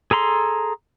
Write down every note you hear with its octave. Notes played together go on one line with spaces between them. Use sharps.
G#4 A4 A#5 C6